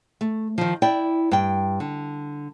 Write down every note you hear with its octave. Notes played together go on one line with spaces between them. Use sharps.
A3
D#3 F3
E4 D5 G5
G2 G5
D3